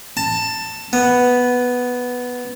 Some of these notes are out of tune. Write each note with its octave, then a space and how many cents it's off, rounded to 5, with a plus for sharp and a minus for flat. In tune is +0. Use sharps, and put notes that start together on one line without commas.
A5 +15
B3 +0